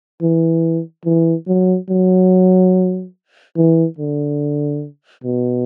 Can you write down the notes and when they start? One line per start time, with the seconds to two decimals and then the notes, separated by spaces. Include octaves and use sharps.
0.22 E3
1.05 E3
1.47 F#3
1.89 F#3
3.57 E3
3.98 D3
5.24 B2